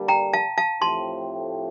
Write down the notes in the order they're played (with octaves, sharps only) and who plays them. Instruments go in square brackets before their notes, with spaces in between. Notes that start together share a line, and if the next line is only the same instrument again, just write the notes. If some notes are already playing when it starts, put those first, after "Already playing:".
Already playing: [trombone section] D3 G3 A#3 D4
[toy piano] G5 A#5
F5 A5
F5 A5
[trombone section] A2 F3 A3 C4 G4 [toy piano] A5 C6